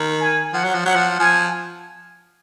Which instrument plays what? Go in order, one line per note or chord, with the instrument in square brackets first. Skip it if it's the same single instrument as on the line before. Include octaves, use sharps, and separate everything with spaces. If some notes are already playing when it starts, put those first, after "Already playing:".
Already playing: [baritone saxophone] D#3
[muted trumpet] G#5
[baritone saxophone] F3 [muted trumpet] F#5
[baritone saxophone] F#3
F3
[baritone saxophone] F#3 [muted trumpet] F#5
[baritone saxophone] F3
[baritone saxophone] F3 [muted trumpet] G#5